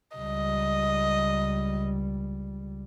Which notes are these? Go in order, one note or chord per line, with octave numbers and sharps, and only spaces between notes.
C#2 G3 D#5